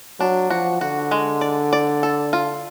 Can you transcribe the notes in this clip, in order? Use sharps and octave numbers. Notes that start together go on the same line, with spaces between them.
F#3 D4
F3 F#4
D3 F#4
G#3
D5
D5
A4
F4